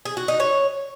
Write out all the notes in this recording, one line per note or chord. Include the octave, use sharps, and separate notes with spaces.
G#4
F#4
D#4
C#5